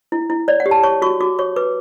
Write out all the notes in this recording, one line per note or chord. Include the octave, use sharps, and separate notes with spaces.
E4
E4
C#5 D5
F#5
G4
A5
C#5 C#6
F#4 C#6
F#4 D6
C#5 C#6
B4 D6